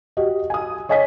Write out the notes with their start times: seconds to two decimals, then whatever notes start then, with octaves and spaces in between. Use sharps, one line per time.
0.17 F#4 G4 D#5
0.50 G#5 D#6
0.89 C#5 D#5 G#5 D#6 B6